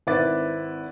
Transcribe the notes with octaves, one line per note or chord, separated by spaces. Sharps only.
G#1 C4 E4 B4 D6 A6